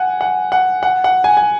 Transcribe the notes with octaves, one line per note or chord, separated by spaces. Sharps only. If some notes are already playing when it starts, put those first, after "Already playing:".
Already playing: F#5 G#5
F#5
F#5
F#5
F#5
G#5
G#5